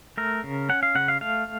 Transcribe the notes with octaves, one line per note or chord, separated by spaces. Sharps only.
A3 A#4
C#3
C#4 F#5
F5
C#3 F#5
F5
A3 F5